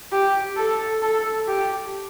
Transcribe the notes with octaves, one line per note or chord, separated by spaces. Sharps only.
G4
A4
A4
G4